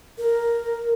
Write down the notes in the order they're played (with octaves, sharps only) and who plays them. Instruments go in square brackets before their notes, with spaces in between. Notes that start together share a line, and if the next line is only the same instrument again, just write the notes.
[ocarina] A#4